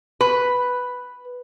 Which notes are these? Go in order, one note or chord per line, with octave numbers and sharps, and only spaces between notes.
B4